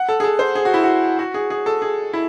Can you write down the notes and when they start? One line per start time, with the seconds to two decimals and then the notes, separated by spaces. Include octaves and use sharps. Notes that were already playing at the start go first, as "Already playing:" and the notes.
Already playing: F#5
0.09 A4
0.20 G#4
0.24 A4
0.39 C5
0.55 G#4
0.65 F#4
0.74 E4
0.84 F#4
1.19 F#4
1.34 G#4
1.50 G#4
1.66 A4
1.82 G#4
2.13 E4